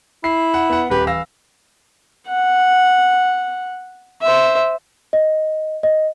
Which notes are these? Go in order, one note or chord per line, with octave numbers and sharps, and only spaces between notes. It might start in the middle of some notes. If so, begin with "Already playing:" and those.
E4 C7
F#5
B3 F#5
D#1 G4 B4
E3 F5 E6 A#6
F#5
C5 E5
D#5
D#5